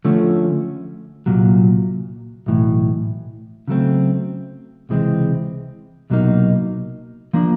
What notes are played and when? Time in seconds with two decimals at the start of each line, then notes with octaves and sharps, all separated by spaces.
0.05 D3 F3 A3 C#4
1.26 C2 A#2 F#3
2.46 B1 A2 E3
3.68 C#3 F#3 A3 C4
4.89 C#2 C3 E3 G#3 C4
6.10 C2 B2 F#3 A#3 D#4
7.33 F3 A#3 D4